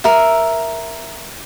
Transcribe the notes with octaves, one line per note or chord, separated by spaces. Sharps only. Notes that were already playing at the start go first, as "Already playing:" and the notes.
A#4 E5